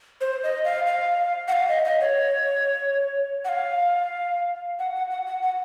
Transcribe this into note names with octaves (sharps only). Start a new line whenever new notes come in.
C5
D#5
F5
F5
F#5
F5
D#5
D#5
C#5
F#5
F5
F#5
F#5
F#5
F#5
F#5